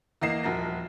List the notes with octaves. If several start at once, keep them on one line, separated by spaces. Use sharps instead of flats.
E2 E3 A#3 D#5 C7 E7
D#1 F3 F#4 A#4 A#6